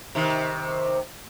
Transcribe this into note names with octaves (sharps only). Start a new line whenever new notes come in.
C3 D#3